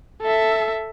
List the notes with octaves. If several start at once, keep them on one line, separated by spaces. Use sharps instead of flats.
A4 E5